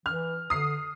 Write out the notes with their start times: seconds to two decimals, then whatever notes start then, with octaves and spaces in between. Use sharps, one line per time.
0.06 E3 F6
0.50 D3 D#6 C7